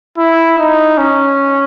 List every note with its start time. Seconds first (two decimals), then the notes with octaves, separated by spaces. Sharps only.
0.18 E4
0.59 D#4
0.98 C#4